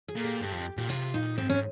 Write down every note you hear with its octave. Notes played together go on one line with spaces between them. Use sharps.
G#4
A#2
G4
G2
F2
A#2 G4
C3 F4
A#2 D#4
G#2 C4
C#4